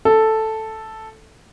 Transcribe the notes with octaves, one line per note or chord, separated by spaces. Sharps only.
A4